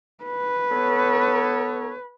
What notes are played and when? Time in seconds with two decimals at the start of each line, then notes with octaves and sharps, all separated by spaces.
0.24 B4
0.72 B3 A4 C#5